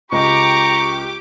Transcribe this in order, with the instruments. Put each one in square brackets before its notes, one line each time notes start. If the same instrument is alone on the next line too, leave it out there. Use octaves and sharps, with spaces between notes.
[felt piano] C#2 [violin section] G4 D6 [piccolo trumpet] A#5 [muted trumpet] C#6